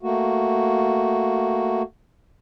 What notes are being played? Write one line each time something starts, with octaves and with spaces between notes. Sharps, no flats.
A3 A#3 F#4